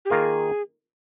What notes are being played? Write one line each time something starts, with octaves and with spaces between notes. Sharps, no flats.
G4
D#3 A#3 F4 G#4 A#4